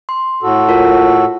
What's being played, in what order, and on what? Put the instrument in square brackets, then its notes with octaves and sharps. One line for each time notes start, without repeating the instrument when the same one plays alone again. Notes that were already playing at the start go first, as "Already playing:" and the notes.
[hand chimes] C6
[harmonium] A2 F#4 A4
[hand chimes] F4 A#4 C#5